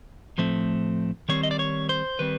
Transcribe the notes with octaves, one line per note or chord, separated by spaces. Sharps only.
A2 F3 A3 C4
D#3 G3 C4 C#5
D#5
D5
C#5
C5
D#3 G3 C4 B4